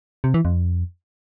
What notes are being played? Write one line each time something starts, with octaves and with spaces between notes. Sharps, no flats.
C3
E3
F2